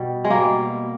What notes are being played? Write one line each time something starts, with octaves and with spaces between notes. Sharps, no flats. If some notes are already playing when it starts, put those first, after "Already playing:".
Already playing: B2 G3
G#3
B2 G3 A#3